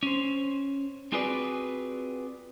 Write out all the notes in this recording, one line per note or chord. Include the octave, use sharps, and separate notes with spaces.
C#4 C5
C4 F4 F#4 G#4 B4 D5